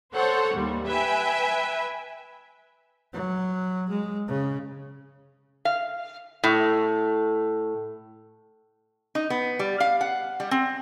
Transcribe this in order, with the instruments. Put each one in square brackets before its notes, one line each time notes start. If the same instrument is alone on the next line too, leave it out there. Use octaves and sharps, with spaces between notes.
[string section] A4 C5 C#5 F#5
D#2 G3
B4 E5 G5 G#5
[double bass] F#3
G#3
C#3
[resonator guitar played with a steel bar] F5
A2
D#4
B3
G3
F5
F#5
G3
C4